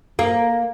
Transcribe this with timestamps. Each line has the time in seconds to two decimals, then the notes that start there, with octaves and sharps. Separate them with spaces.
0.19 A#3